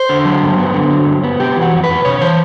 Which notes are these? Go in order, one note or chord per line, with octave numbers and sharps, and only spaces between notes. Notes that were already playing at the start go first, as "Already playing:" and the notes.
Already playing: C5
D3
F#3
G2
B3
D3
F#3
G2
B3
C3 G4
E3
F#4
F2
B4
F2
C3 C#5
E3 C5